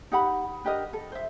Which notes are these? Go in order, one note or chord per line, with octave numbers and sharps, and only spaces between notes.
D#4 G4 F#5 B5
D4 G4 A#4 D#5
A4
C5 E5